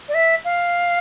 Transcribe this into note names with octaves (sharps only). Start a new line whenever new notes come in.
D5
E5
F5